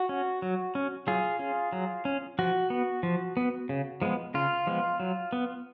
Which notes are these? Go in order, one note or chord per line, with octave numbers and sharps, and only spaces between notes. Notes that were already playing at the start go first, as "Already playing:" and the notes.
Already playing: F#4
C#4
F#3
C#4
F#3 F4 G#4
C#4
F#3
C#4
F3 F#4
B3
F3
B3
C#3
F3 G#3 B3
C#3 F4
F3 G#3 B3
F#3
B3